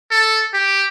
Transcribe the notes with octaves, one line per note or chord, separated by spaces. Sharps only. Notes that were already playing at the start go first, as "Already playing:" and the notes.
A4
G4